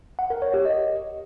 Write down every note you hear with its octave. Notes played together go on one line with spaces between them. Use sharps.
F#5
A#4
C#5
G4
D#5